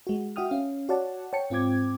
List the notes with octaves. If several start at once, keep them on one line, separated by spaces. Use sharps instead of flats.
G#3 F#4
F#4 E5 G5 D#6 F6
C#4 F5
F#4 C#5 D5 F#5 A5
C#5 G5 A5 C#7
G#2 C4 F4 G5 D6 G#6